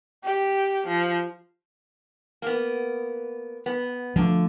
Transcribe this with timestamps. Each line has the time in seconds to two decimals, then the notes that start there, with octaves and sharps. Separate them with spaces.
0.24 G4
0.87 F3
2.42 A#3 B3
3.66 B3
4.16 D3 F3 A3